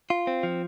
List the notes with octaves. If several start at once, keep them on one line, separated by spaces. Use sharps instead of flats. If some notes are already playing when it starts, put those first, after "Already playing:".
F4
C4
F3